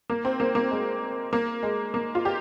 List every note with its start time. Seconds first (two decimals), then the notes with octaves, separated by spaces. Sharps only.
0.10 A#3
0.25 C4
0.40 A#3
0.55 A#3
0.71 G#3
1.33 A#3
1.63 G#3
1.94 A#3
2.15 F4
2.25 G4